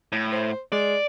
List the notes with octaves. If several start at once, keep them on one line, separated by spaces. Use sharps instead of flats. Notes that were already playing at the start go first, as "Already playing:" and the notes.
A2
C5
G#3 D5